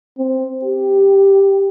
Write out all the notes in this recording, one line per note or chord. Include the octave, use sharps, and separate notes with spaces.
C4
G4